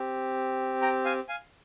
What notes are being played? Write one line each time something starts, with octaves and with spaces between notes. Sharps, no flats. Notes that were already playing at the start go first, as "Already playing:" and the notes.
Already playing: C4 G4
G5 A#5
F5 G#5
F5 G#5